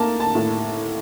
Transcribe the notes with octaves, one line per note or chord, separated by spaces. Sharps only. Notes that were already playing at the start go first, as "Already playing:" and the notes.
Already playing: A2 A#3 A5
A5
A2